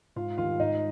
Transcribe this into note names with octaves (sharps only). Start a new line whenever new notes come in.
G#2 F4 F5
D#3 G3 F4 F5
G#2 D#4 D#5